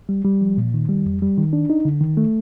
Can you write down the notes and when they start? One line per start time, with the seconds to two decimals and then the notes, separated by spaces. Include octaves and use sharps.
0.09 G3
0.25 G3
0.41 F3
0.58 A#2
0.74 D#3
0.89 G3
1.06 F2
1.22 G3
1.38 D#3
1.53 D4
1.70 D#4
1.85 D3
2.01 D#3
2.17 A3